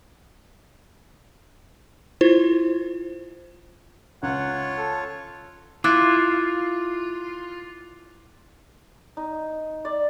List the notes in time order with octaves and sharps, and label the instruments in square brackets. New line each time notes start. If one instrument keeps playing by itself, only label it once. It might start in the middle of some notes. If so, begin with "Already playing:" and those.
[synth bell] E4 F4 C5
[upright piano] C#2 [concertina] F4 C#5 [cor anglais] F#5
[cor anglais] A4
[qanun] E4 [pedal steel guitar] F4 [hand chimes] D6 F#6 A6
[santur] D#4
D5